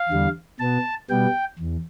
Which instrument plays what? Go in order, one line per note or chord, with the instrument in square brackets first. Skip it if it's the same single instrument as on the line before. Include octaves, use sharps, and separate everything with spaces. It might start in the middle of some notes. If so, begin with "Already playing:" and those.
Already playing: [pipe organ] F5
E2 D3 G3
B2 B3 A5
B2 G3 B3 G5
E2